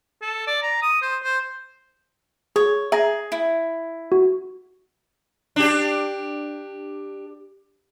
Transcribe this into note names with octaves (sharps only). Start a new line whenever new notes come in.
A4
D5
A#5
D#6
C5
C5
G#4 C#5
G#4 E5 A#5 A#6
E4
F#4
D4 G4